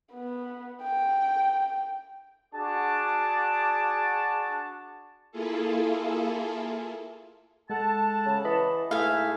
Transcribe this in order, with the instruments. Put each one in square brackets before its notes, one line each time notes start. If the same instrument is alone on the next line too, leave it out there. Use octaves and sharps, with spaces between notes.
[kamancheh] B3
G5
[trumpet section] D4 F#4 G#4 A5 D6
[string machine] A#3 E4 F4 G#4 A4
[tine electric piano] G#3 [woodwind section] A4 F#5 A5
[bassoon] C#3
[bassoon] E3 [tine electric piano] D#5 B5
[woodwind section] G#2 G#4 E5 [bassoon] A3 [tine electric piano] E4 [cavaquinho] F5 G#5